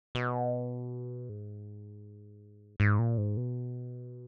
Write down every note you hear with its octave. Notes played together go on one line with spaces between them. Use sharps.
B2
G#2
G#2
A#2
G#2
B2